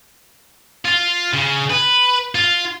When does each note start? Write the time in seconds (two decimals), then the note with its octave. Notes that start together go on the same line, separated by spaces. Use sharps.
0.85 F4
1.33 C#3
1.70 B4
2.35 F4